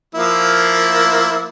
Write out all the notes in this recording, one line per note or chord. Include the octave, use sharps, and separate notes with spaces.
F3 A#3 E4